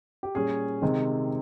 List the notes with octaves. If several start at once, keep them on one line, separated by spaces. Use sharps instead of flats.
G4
A#2 G3 C#4 G#4
C3 D#3 G#3 C4